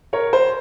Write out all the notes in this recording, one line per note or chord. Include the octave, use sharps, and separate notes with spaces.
A#4 C#5
C5